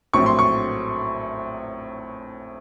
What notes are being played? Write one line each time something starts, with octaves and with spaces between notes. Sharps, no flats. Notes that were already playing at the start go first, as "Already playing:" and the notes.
A#1 A2 F#3 C4 C#6
C6
C#6